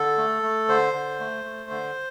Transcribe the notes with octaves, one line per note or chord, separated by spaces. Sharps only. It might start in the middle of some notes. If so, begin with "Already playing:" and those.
Already playing: D3 A4
A3
A3
D3 C5
D3
A3
A3
D3